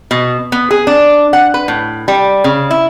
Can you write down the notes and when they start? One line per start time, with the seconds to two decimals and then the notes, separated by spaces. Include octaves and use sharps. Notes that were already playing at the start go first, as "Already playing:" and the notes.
0.11 B2
0.52 B3
0.71 G#4
0.87 D4
1.33 F#5
1.54 B4
1.68 A2
2.08 G3
2.44 C#3
2.71 E4